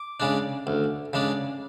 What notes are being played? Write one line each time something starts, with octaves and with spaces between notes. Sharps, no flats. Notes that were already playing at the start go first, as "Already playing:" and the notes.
Already playing: D6
C#3 G#3 D4
D2
C#3 G#3 D4